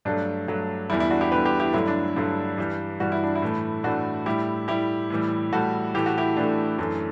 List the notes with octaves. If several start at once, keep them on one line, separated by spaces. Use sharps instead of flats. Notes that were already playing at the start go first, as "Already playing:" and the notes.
G2 F#3 A3 D4
G2 F#3 A3
E2 D3 G3 E4
E4
D4 F#4
E4 G4
E2 D3 G3 G4 B4
G4 B4
E4 G4
G2 D3 F#3 A3 E4
D4
G2 D3 F#3 A3
G2 E3 G3
G2 E3 G3 F#4
E4
D4
E4
A2 E3 A3
A2 E3 A3 D4 F#4
A2 G3 E4 G4
A2 G3 E4 G4
A2 E3 G3
A2 E3 G3 F#4 A4
A2 E3 A3 G4
F#4
E4 G4
A2 E3 A3 D4
F#2 E3 A3